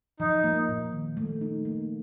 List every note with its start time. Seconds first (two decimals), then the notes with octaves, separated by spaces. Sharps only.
0.20 F3 D#4
0.44 A#3
0.68 A#2
0.92 D#3
1.17 A3
1.41 D#4
1.65 A#3